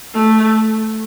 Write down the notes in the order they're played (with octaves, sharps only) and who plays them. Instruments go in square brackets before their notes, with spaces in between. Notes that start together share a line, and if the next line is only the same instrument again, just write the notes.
[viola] A3